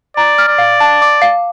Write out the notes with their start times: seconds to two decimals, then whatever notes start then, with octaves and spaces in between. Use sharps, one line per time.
0.17 D5 A#5
0.38 F6
0.48 D5
0.58 F5
0.80 A5
1.02 D6
1.22 F5